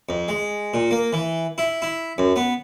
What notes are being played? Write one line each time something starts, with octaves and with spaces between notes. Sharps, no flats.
F2
G#3
A#2
A#3
E3
E4
E4
F#2
B3